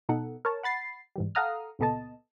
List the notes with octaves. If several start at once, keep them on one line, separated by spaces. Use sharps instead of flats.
B2 B3 D#4 A4 F#5
A#4 C#5 A5
F#5 B5 A6 C7
G#2 E3 G3
A4 F5 F#5 A#5 D#6 F6
C#2 A#2 B3 A4 D#5 A5